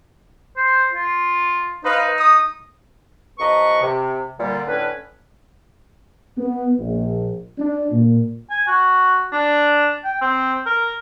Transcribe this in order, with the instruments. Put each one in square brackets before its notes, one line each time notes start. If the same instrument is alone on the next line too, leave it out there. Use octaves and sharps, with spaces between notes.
[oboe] C5
F4
[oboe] D#4 [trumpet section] B4 C5 F5
[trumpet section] D#6
[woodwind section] C2 F3 B4 D#5 A#5 C#6
C3
A#2 D3 G3
A2 D3 C#4 B4
[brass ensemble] B3
A#1
D4
A#2
[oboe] G#5
F#4
D4
G5
C4
A#4